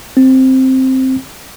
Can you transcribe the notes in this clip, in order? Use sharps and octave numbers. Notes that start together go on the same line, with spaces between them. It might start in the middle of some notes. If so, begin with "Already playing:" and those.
C4